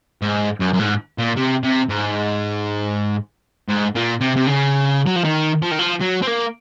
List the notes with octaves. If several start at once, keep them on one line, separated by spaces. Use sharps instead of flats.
G#2
F#2
F#2
G#2
A#2
C3
C3
G#2
G#2
A#2
C3
C3
C#3
F#3
F3
D#3
F3
D#3
F3
F#3
C4
A#3